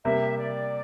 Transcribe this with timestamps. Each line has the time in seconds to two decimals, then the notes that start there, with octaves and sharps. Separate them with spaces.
0.04 C3 G3 A#3 E5
0.38 D5